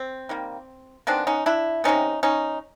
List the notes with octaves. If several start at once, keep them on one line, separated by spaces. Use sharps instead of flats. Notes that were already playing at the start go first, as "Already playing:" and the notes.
Already playing: C4
D#3 G3 A#3
D#3 G#3 B3 C4 D4
C#4 D#4
D4 E4
C3 D#3 G3 B3 C#4 D#4
C#4 D#4